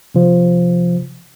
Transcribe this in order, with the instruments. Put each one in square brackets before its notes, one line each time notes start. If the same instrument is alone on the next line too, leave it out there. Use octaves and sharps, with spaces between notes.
[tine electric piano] C3 F3